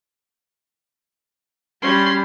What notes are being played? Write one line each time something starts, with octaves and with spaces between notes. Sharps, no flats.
G3 C#4 B5 C6